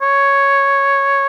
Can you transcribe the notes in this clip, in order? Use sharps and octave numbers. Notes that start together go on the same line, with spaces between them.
C#5